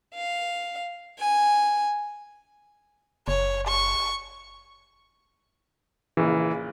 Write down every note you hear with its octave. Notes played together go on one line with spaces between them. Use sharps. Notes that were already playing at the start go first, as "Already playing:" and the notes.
F5
G#5
F#1 C#5
C#6
A#1 C#3 E3